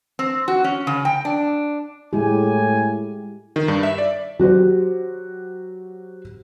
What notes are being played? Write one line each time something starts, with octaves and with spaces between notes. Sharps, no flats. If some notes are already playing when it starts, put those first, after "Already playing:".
C4
F#4
C#4
C#3
G5
D4
A2 G#3 E4 G4 G#5
D#3
G2
E5
D5
F#3 F#4 G4 C5